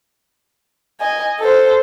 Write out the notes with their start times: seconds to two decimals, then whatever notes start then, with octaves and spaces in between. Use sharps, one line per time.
1.01 D#5 G#5
1.39 A4 C5